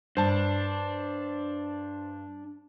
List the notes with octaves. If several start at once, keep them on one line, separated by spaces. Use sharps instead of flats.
G2 D4 C5 A5